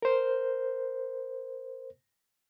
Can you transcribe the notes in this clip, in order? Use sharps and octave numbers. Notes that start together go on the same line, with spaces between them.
A#4 C5